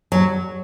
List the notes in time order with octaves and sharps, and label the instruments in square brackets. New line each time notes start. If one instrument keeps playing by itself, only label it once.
[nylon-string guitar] F#3